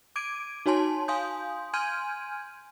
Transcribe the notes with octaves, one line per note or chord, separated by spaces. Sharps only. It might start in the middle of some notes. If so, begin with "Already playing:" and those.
D6 G#6 D7 D#7
D#4 F#4 C#5 G#5 A5 C6
F5 G#5 C6 D#6 G6
G#5 C6 F6 G6 G#6 D#7